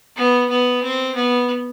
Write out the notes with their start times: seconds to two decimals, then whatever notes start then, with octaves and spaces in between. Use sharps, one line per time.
0.17 B3
0.50 B3
0.83 C4
1.15 B3